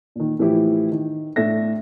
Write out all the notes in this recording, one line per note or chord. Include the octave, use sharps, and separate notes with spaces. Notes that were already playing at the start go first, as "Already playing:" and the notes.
A#2 D#3
A2 E3 F3 E4 G4
D#3
A2 D4 A4 E5 A#6